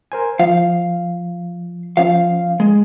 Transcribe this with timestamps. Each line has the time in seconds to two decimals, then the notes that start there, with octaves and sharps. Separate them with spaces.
0.12 A#4 C5 G#5
0.39 F3 F5
1.97 F3 C#4 F5
2.60 G#3